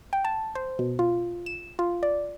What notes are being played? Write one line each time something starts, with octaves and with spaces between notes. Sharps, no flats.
G5
A5
C5
B2
F4
E7
F4
D5